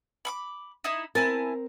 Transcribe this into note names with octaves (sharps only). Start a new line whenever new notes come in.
B5 C#6 D6
D#4 E4 D#6
C4 E4 A#4 G#5 A5